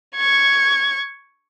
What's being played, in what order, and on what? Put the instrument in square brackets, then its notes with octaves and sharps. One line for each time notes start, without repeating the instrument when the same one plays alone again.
[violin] C#6 G#6